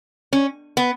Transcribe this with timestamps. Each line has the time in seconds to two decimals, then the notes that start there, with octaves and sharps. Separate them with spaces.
0.33 C#4
0.77 B3